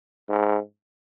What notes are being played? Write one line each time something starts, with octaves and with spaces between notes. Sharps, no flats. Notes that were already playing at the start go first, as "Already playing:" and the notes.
G#2